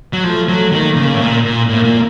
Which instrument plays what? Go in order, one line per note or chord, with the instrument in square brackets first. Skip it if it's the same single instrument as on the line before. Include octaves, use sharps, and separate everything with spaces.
[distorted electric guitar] F#3
[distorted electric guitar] F3 [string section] A3
[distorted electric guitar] F#3
[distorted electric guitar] D#3 [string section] A#3
[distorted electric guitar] C#3
A2
A#2
A#2
[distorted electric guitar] A2 [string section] A#3
[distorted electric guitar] A#2